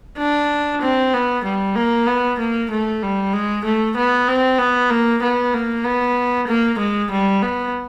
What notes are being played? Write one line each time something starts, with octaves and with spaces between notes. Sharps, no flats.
D4
C4
B3
G3
A#3
B3
A#3
A3
G3
G#3
A3
B3
C4
B3
A#3
B3
A#3
B3
A#3
G#3
G3
B3